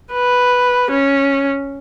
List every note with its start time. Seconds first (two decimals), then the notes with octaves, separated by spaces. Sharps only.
0.12 B4
0.91 C#4